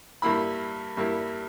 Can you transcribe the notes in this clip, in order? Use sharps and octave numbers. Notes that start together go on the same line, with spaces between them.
G2 G3 A#3 E4 B5
G2 G3 A#3 E4